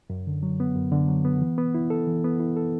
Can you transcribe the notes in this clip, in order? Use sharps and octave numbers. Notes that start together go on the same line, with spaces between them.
F#2
D3
F#3
B3
F#2
D3
F#3
B3
E3
B3
E4
A4
E3
B3
E4
A4